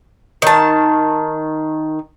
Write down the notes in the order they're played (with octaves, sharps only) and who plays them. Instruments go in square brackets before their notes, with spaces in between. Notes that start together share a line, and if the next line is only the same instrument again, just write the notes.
[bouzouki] D#3 A5